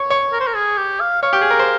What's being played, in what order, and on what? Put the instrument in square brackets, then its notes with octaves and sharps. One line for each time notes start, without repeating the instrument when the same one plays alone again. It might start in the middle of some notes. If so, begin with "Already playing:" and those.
Already playing: [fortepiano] C#5
C#5
[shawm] A#4
C5
A#4
G#4
G4
F5
[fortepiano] C#5 [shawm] F5
[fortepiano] G4
G#4
A#4
C5